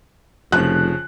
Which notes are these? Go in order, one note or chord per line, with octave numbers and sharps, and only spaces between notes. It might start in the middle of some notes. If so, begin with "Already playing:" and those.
F1 C#3 F3 F#6